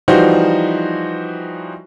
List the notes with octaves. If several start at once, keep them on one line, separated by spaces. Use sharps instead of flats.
E3 F3 G3 D#4 F#4 C5